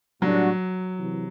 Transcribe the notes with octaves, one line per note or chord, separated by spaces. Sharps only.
A2 F#3 G3 D4 F#4
C3 E3